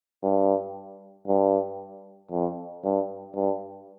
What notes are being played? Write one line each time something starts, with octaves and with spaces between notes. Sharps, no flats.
G2
G2
F2
G2
G2